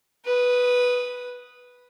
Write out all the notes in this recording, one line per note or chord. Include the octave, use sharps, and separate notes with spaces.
B4 D#6